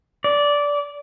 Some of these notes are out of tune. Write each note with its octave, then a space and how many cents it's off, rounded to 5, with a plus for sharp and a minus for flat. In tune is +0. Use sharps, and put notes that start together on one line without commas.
D5 -15